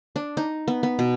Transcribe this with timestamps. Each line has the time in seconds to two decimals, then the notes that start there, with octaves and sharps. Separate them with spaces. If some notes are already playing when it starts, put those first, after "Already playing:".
0.16 D4
0.37 D#4
0.68 B3
0.83 B3
0.99 B2